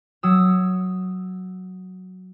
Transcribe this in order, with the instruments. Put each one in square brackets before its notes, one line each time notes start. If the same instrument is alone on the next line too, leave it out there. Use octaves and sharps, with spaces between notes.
[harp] F#3 D#6 E6